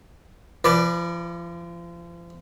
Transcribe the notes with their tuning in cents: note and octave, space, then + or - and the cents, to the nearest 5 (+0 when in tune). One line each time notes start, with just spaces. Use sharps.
F3 -35 B4 +0 D5 +0